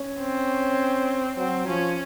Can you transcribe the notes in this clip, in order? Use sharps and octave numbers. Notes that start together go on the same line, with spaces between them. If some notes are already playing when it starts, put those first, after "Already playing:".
Already playing: C#4
C4
F#3 C4
F3 C#4